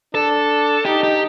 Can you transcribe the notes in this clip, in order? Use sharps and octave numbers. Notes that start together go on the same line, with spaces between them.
D4 A4
D#4 G4
G4